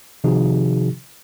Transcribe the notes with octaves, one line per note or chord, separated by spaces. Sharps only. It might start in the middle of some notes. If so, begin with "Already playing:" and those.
C3 D#3 F3 D#4 F#4 G#4